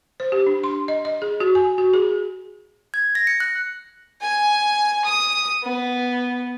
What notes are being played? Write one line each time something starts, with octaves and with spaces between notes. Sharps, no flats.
C5
G4
D4
C6
D#5
D#5
G#4
F#4
G#5
F#4
G#4
G#6
A#6
C#7
F#6
G#5
D#6
B3